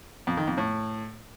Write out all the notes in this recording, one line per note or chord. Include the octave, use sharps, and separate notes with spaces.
F2
D#3
F2
A2